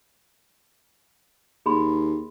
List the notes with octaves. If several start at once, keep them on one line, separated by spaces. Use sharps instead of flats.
D#2 G#4 B5 C6